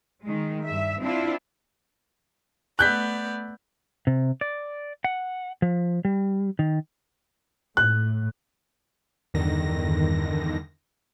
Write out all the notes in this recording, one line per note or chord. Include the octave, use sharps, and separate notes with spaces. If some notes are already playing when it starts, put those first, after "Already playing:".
D#3 G#3
G2 E5
C4 D4 E4 F4
A3 B3 D5 F#6 G6 B6
C3
D5
F#5
F3
G3
D#3
A2 F#6
E2 G2 D3 D#3 A#6